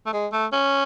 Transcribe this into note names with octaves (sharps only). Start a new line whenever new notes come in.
A3
G#3
A3
C#4